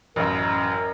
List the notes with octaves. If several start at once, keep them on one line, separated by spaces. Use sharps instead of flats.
A1 F#2 A#4